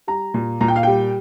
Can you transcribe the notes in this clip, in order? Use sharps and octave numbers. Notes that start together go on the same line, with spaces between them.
G3 A#5
A#2
A#2 A#5
G5
F5
G3 G5